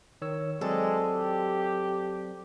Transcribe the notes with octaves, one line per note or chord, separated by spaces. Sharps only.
D#3 C#5 E6
F#3 G#3 C4 A4 D5
G4